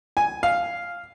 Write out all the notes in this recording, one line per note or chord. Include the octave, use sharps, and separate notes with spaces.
G#5
F5